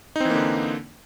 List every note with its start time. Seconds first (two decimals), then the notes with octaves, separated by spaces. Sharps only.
0.16 D#4
0.20 C4
0.25 E3
0.30 A#3
0.35 D3